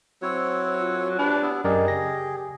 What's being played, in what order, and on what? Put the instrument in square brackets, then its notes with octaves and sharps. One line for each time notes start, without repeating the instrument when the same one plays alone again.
[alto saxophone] F#3 [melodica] C4 E4 C#5 [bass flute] C5
[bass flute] F4
[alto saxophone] D4 [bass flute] G4 [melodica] B4
[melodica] B3 E4
[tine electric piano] F#2 A#4 D5 [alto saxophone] G4 [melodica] G#4 [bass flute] D#5
[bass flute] C#3 [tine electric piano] A#6